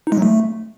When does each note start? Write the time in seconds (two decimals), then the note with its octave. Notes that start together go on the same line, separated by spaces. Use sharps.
0.07 D#4
0.12 G#3
0.17 F#3
0.22 A3